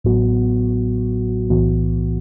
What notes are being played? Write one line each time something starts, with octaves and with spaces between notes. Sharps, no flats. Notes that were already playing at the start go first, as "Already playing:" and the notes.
A1 A2 F#3 B3 F#4
B1 A2 E3 B3 F#4